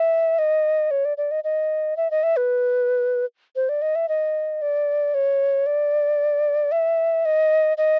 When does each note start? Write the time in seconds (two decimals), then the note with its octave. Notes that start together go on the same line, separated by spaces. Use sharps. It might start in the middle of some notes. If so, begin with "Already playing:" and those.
Already playing: E5
0.38 D#5
0.91 C#5
1.05 D5
1.17 D5
1.31 D#5
1.44 D#5
1.97 E5
2.11 D#5
2.23 E5
2.37 B4
3.56 C5
3.69 D5
3.82 D#5
3.95 E5
4.09 D#5
4.62 D5
5.14 C#5
5.66 D5
6.72 E5
7.25 D#5
7.78 D#5